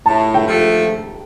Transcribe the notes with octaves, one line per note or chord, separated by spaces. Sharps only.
A2 A5
G5
F3 A3